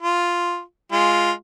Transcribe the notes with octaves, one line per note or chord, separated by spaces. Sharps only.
F4
G#3 F4